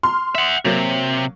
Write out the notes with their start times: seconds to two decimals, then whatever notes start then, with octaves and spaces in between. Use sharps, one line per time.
0.03 C6 F6
0.35 E5 F#5
0.65 C3 F#3 A#3